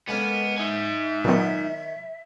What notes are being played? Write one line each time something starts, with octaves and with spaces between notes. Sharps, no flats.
G#3 A#3 B3 C#4 A4
D#4 E5 G#5
A#2 D#3 F#3 B3 C#5